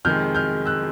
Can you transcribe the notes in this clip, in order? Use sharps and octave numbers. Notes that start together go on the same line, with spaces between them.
F2 C3 D#3 G#3 F6 G6
F6 G6
E6 F#6